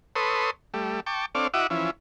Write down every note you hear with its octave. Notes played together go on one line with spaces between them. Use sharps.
A4 B4 C#5 C6 D#6
G3 A3
G5 A5 C#6 D6
C4 D4 A4 C#5 D5 F5
E4 F#4 D#5 E5 F#5 D6
E3 F3 C#4 E4